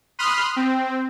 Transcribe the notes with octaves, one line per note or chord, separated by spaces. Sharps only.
B5 C6 D#6 F6 F#6
C4